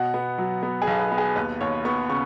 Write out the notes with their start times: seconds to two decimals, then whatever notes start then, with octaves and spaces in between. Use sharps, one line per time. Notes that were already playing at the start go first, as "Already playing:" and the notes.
Already playing: B2 F#5
0.14 B3
0.38 F#3
0.63 B3
0.82 G#4
0.87 B1
0.99 B4
1.12 B3
1.18 G#4
1.36 D#2 B4
1.61 D#2 C#5
1.85 B3 C#6
2.10 C#3 C#6